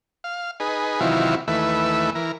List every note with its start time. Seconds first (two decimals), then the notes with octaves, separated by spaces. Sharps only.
0.24 F5
0.60 D#4 G#4 B4
1.01 C3 D#3 E3 F#3 E4 F4
1.48 D#2 E3 A3 B4 E5
2.15 E3 A#4